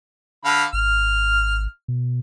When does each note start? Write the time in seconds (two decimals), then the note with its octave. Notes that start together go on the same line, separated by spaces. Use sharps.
0.45 D3 F5 B5
0.73 G#1 F6
1.88 B2